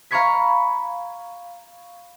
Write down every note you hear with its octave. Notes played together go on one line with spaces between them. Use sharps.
F5 A#5 B5 C#6 G#6 B6